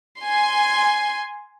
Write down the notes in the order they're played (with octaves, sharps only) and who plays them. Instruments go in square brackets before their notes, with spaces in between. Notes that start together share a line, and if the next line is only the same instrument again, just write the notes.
[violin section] G#5 C6